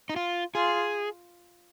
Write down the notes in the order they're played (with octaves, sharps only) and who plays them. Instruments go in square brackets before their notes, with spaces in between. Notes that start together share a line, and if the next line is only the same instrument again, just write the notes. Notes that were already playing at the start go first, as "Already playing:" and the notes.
[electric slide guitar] D#4
F4
[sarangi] F4 [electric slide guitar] G#4